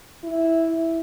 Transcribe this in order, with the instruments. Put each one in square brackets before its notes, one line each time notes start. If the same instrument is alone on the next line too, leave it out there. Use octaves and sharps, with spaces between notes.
[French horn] E4
E4